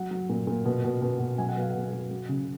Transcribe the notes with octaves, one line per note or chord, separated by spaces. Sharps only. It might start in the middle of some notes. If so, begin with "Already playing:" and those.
Already playing: F#3 F#5
F#3
A#2
A#2
B2
B2
B2
B2
F#3 G#5
F#5
B2 F5
B2 F#5
F#3
F#3
C#3